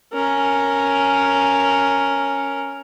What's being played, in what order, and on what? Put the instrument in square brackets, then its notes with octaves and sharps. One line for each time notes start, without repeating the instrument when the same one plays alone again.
[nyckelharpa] C#4 A#4